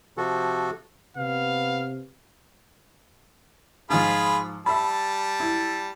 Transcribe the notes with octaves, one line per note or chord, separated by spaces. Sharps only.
C3 F3 F#4 A4
C3 B3 F5
G#2 F3 F4 G#4 B5
G3 E5 A5 B5
E4